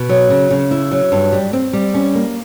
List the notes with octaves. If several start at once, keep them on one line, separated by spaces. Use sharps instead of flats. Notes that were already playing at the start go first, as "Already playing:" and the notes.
Already playing: B2
F#3
C#3
C#3
E4
F#3
G2
G3
C4
G3
C#4
A#3